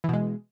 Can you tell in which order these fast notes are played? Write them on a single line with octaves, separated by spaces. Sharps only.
E3 B2 G#3